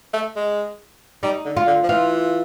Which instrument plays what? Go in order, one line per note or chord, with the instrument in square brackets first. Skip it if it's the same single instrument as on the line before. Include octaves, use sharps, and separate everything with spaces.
[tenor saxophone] A3
G#3
[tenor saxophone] G3 [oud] D#4
[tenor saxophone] D3
[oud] F4
[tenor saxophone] D3
F3
[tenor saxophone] E3 [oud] F4